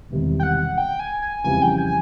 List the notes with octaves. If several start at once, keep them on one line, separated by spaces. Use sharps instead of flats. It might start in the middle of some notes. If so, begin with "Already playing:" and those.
E1 E2 C3 D#3 G3
G5
F#5
G5
G#5
G#5
F2 C#3 E3 G3 G#5
G5
G#5